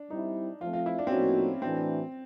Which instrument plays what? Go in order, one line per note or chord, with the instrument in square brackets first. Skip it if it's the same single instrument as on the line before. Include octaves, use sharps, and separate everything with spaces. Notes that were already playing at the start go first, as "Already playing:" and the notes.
Already playing: [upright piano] D4
[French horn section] G3 C4 E4 [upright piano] D#4
[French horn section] F3 A3 C4 [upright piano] F4
[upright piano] F4
E4
D4
C4
[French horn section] A2 F3 A#3 D#4 F#4 [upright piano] C#4
[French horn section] A2 E3 A3 D4 F#4 [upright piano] C4